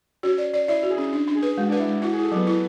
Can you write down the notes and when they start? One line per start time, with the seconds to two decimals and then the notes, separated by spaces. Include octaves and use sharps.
0.23 C#4 F#4
0.38 D5
0.54 D5
0.68 E4 D5
0.83 F#4
0.90 G#4
0.98 C#4
1.13 D4
1.28 D4
1.35 G#4
1.43 B4
1.57 G#3 F#4
1.69 D4 B4
1.79 E4
1.87 G#3
2.02 E4 F#4
2.13 G#4
2.17 E4
2.24 A4
2.32 F#3 B3
2.47 E4